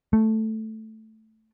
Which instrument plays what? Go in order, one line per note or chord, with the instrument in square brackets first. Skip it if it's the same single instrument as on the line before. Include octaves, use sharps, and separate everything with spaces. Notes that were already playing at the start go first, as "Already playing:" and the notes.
[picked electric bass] A3